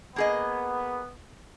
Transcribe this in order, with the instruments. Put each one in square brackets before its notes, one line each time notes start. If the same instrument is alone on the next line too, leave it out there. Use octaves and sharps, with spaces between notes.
[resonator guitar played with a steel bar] A#3 G#4 D#5 [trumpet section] B3